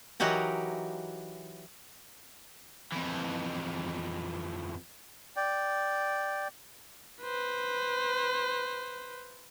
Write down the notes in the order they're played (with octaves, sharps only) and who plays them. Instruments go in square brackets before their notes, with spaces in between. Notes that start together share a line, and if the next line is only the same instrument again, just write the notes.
[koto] E3 F#3 D#4 F#4 G4 A#4
[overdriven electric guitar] F2 E3
[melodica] D5 G5
[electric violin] B4 C5